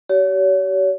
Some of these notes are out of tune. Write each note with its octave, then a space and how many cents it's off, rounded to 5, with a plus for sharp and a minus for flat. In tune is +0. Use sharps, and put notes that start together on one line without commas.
G4 -40 C#5 +35